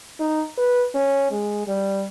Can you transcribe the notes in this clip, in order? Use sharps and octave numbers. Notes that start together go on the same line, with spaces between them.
D#4
B4
C#4
G#3
G3